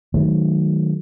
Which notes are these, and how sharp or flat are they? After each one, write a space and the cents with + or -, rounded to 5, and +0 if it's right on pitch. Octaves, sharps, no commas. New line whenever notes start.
D#3 +5 F#3 +0 A3 -30